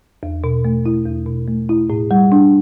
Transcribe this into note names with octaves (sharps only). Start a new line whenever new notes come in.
E2
B2
A3
E4
E2
B2
A3
E4
A2
G3
D4